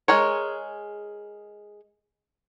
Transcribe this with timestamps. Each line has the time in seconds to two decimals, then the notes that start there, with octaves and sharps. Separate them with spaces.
0.08 G#3 G#4 A#4 C#5